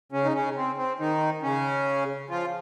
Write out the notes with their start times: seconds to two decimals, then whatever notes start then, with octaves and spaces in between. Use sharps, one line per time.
0.12 C#3 C#4
0.24 D#4
0.34 C#3 C#4
0.56 C4
0.78 C4
1.00 D#3 D#4
1.43 C#3 C#4
2.30 F3 F4